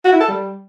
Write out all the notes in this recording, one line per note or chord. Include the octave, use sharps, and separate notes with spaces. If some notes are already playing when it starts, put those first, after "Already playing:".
F#4
E4
A4
G3